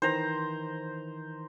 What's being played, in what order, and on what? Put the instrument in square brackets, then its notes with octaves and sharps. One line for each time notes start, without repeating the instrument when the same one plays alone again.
[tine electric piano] D#3 E3 [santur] C5 A#5